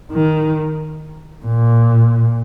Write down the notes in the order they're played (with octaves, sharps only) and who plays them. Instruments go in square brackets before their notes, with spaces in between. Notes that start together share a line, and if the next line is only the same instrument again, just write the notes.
[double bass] D#3
A#2